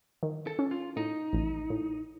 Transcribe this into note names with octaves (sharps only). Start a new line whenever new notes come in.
D#3
A4
C#4
F4
A2 D#4
A1
A2